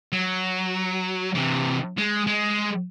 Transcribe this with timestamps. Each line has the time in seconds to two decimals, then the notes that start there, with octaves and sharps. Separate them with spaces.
0.13 F#3
1.35 C3 E3
1.98 G#3
2.27 G#3